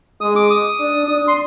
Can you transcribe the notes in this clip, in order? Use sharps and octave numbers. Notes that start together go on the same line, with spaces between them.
G#3 D#6
D6
D#6
D4
D4 D#6
C6